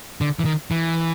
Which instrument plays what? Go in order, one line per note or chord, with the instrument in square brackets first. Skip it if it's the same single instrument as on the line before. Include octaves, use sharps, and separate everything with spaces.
[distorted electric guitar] D3
E3
D#3
E3